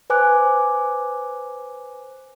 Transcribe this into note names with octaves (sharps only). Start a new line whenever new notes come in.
B4 C5 G#5 D6 F#6